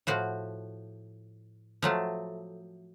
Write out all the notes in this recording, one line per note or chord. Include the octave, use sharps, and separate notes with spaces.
A2 F3 F#4
F3 F#3 A3